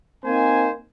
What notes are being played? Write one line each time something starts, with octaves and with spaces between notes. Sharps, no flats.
A#3 C4 D#4 C5 G#5